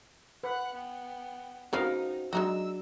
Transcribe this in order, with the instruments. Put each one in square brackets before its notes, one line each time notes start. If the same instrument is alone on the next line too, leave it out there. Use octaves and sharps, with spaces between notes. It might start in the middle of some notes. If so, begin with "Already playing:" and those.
[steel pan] B4 [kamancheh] F#5 F#6
[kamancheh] B3 G5
[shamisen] C#3 F3 B3 [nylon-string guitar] C4 F#4 [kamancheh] D#4 [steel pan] A#4 F5
[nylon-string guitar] F#3 D4 [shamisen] G#3 D#4 F#4 [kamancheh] E6